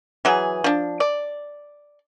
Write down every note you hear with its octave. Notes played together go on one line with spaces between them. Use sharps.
E3 F#3 G#4
F3 D4
D5